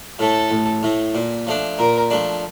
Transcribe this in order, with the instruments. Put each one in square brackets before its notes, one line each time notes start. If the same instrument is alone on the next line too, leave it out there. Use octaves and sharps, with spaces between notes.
[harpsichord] A2 A3 [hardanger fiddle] A4
[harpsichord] A1
A2 A3
A#2
F3 A3 D4
[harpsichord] A#2 [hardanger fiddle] A#4
[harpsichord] F3 A3 D4